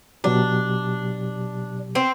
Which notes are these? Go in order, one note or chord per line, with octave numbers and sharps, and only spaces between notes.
B2 F#3 D4 G4
C4